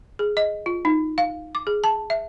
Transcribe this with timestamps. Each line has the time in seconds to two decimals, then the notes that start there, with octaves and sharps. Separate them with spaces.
0.19 G#4
0.37 D#5
0.66 F4
0.85 D#4
1.18 F5
1.55 D6
1.67 G#4
1.84 A5
2.10 E5